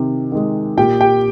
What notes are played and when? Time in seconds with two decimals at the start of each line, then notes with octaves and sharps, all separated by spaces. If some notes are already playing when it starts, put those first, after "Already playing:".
Already playing: C3 D#3
0.32 D#3 G#3
0.77 A#2 G4 G5
1.00 G4 G5